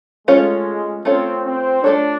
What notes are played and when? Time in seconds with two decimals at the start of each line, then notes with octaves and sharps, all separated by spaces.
0.28 G#3 A3 C#4 F4 A4 C#5
1.05 A3 C4 C#4 F4 A4 C#5
1.45 C4
1.84 A3 C#4 D4 F4 A4 C#5